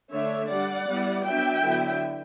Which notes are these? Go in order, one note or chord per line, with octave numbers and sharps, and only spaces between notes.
D3 A3 D4 C#5 E5
G3 D4 D5 F#5
G3 B3 E4
F#3 B3 D4 E5 G5
D3 F#3 B3 E4